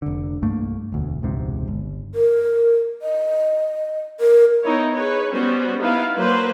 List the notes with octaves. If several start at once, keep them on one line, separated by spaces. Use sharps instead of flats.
F1 D3
C2 G2 A3 A#3
E1 D2
E1 C#2 G#2 C3
G1
A#4
D#5
A#4
B3 D#4 E4 C#5
G#4 B4 C#5
G3 B3 C#4 F#4 C5
B3 D#4 E4 B4 F5
F#3 A#3 B4 C5